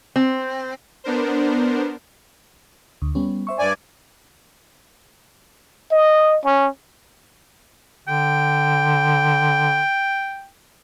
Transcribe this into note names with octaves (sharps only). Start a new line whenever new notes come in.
C4
B3 D4 A#4 C5
D2
G3 B3 C#4
C5 E5 C#6
G2 D5 G#5
D#5
C#4
D3 G5